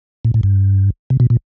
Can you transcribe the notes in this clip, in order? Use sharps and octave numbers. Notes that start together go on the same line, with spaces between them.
A#2
A2
G2
C3
B2
A#2